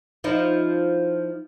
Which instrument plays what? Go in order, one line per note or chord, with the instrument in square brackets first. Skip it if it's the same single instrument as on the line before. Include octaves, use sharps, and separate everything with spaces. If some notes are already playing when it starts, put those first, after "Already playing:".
[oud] F3 D#4 E4